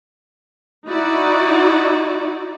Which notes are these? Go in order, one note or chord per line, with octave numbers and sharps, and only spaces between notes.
D#4 E4 F#4 D5